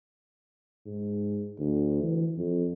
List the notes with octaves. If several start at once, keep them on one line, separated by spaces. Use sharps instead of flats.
G#2
D2
E3
F2